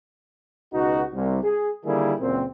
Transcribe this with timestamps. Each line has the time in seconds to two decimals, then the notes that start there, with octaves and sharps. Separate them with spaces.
0.74 C#2 B2 D#4 F#4
1.14 C2
1.43 G#4
1.85 D3 D#3 G3 A#3 E4 G#4
2.20 C#2 F#2 A#2 C4